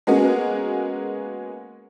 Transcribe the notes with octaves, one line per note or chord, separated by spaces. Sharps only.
G#3 A#3 B3 C#4 F#4 A#4